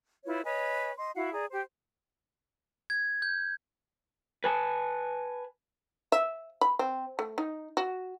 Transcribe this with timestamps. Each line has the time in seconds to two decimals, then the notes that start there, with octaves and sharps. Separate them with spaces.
0.25 E4 F4 B4 C#5
0.44 B4 C#5 D#5 G#5
0.97 D#5 C6
1.15 E4 F#4 F5 F#5
1.32 G#4 D5 A#5
1.50 G4 C5
2.90 G#6
3.22 G6
4.44 B4 G#5 A5
6.12 E5
6.61 B5
6.79 C4
7.19 A3
7.38 D#4
7.77 F#4